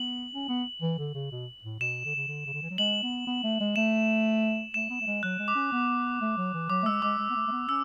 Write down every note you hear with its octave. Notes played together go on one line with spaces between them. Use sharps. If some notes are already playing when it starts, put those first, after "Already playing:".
Already playing: B3 F#7
C#4
B3
E3
D3
C#3
B2
A2
B2 E7
D3
C#3
D3
C#3
D3
E3
F#3
G#3 F#7
B3
B3
A3
G#3
A3 E7
A3 E7
B3
A3
G#3
F#3 F#6
G#3
D6
C#4
B3
A3
F#3
E3
F#3 D6
A3
G#3 E6
G#3 D6
G#3
B3
A3
A3
B3
C#4 E6